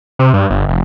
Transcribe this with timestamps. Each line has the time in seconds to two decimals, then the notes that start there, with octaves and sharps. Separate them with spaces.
0.19 C3
0.33 G2
0.50 G1
0.69 F1